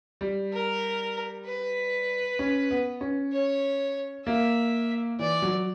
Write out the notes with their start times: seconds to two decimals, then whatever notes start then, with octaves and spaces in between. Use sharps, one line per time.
0.21 G3
0.53 A#4
1.45 B4
2.39 C#4
2.71 B3
3.01 C#4
3.32 C#5
4.26 A#3 E5
5.19 E3 D5
5.42 F#3